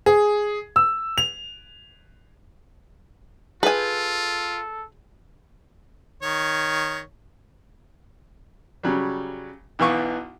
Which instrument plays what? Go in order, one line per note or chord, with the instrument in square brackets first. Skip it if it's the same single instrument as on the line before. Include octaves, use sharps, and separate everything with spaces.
[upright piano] G#4
E6
F7
[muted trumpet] F4 [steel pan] G#4 [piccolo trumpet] A4 [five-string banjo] B4 G#5
[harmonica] D#3 C#5
[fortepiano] C#3 F#3 G3
B1 B2 E3 F5 C#6 D6